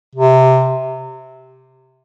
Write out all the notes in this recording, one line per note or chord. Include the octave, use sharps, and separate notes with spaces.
C3